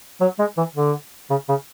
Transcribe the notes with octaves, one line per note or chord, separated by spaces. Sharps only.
F#3
G#3
E3
D3
C#3
C#3